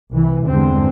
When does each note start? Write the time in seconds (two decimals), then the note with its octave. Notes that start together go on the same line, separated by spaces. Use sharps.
0.12 C2 E3
0.49 E2 G2 D3 G#3 C4